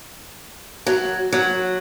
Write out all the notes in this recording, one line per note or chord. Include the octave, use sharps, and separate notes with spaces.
F#3
F#3